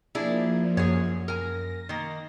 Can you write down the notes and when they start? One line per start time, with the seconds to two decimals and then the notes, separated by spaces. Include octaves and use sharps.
0.15 F3 A#3 D4 E4 G#4
0.77 F#2 G#4 C#5
1.28 A#4 G#5 A#6
1.89 D#3 A#3